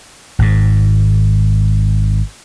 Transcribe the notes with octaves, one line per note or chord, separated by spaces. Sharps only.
G#1 G#2